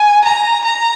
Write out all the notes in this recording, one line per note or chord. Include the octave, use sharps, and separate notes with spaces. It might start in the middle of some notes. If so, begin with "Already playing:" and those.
Already playing: G#5
A#5
A#5